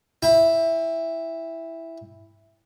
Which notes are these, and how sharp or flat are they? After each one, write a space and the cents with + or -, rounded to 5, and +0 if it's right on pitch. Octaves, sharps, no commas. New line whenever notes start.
E4 +0 G5 +35